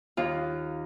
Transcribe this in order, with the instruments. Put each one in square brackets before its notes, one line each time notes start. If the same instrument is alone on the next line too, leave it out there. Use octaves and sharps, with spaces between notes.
[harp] D#2 F4